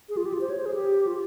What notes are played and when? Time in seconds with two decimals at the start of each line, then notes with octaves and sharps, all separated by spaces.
0.09 G#4
0.17 F4
0.26 G4
0.34 F4
0.41 C5
0.50 C#5
0.58 C5
0.66 G#4
0.74 G4
1.07 F4